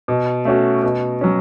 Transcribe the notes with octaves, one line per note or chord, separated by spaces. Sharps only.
B2
A3 C#4 F#4
B2
F#3 C#4